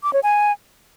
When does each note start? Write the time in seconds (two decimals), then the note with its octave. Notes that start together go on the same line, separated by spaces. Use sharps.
0.03 D6
0.13 C#5
0.23 G#5